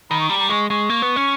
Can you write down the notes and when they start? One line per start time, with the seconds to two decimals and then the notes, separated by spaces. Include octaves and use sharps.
0.10 D#3 B5
0.21 C#6
0.29 G3 A#5
0.40 A#5
0.49 G#3 C#6
0.70 G#3 C#6
0.89 A#3
1.02 B3
1.16 C#4